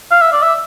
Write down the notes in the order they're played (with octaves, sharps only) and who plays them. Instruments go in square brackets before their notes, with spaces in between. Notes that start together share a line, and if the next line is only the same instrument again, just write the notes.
[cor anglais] F5
E5
D5
E5